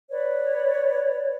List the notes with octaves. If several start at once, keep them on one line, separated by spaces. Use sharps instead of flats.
B4 C#5 D5